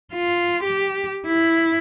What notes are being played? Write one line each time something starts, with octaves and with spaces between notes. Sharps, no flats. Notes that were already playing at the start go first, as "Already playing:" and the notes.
F4
G4
E4